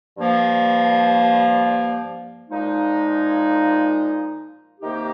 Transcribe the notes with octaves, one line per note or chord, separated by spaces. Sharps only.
G2 F3 A#3
A#2 F3 G#3 D#4
C3 D#3 A#3 D#4 G4